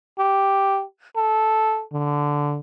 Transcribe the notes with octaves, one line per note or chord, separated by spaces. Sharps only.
G4
A4
D3